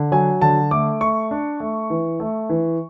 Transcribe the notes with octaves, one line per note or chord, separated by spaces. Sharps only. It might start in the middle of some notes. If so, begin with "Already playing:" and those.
Already playing: D3
F#3 G#5
D3 A5
A3 D6
A3 C#6
D4
A3
E3
A3
E3